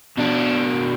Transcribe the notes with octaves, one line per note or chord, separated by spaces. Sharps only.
B2 D4